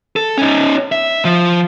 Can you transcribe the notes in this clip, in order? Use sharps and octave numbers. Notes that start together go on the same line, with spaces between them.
A4
C#4 D#4
E5
F3